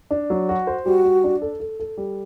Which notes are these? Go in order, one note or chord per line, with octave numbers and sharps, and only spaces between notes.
D4
F#3
F#4
C5
G3 F#4
G3
D4
A4
A4
A4
G3